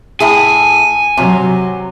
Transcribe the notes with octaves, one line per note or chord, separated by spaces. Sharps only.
A2 E4 G#4 G#5
C3 F#3